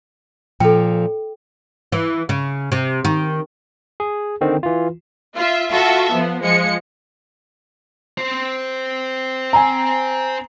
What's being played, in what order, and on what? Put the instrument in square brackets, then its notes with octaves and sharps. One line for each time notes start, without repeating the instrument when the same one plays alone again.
[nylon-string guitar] A#2 F3 [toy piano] A4 G5
[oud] E3
C#3
C3
D#3
[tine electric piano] G#4
D3 D#3 C4
E3 F4
[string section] F4 E5
F4 F#4 A4 E5
F3 B3
F3 G#3 C#7
[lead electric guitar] C4 C5
[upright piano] G#5 A#5